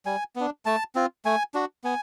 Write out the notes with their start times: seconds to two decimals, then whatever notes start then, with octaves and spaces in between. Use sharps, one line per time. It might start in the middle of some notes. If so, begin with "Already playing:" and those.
0.06 G3 G#5
0.36 B3 D4
0.66 A3 A5
0.95 C4 F4
1.25 A3 G#5
1.54 D4 F#4
1.84 B3 G#5